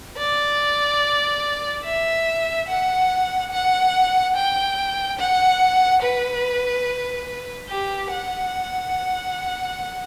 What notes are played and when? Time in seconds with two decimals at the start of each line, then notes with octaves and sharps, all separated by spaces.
0.17 D5
1.85 E5
2.68 F#5
3.52 F#5
4.36 G5
5.19 F#5
6.02 B4
7.69 G4
8.11 F#5